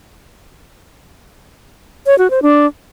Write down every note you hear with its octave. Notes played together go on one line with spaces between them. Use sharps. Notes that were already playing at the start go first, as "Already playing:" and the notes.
C#5
F#4
C5
D4